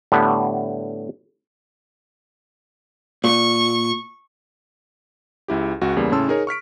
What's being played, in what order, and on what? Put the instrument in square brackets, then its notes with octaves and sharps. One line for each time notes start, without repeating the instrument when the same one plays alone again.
[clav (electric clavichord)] A2 D3 G3 B3 G4
[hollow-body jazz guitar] A#2 [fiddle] C#6
[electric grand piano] C#2 E4 G4
C#2 F#4
E2 C#3 G3 A#3
A2 C#3 C#4 A5 C6 E6
D#4 G#4 A#4 C#5
C#6 F6 B6 D7